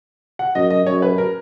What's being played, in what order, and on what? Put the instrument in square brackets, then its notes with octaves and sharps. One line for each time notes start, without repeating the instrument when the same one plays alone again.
[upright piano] F#5
[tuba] F#2 [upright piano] D#5
[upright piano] D#5
[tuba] F#2 [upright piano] C#5
[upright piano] B4
A#4